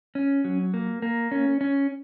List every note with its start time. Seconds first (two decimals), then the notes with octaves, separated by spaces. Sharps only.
0.15 C#4
0.44 F#3
0.74 A#3
1.02 A#3
1.32 C#4
1.61 C#4